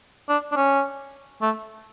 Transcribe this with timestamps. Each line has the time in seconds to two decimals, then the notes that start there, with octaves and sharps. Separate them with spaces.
0.29 D4
0.52 D4
0.56 C#4
1.42 A3